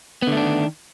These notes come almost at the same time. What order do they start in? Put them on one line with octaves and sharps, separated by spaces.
B3 D3 A3 D4 D#3